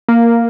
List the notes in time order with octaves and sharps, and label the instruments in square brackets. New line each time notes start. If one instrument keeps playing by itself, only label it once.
[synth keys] A#3